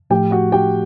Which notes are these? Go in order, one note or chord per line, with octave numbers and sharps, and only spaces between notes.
A2 F3 A3 G4 G5
F#4 F#5
G4 G5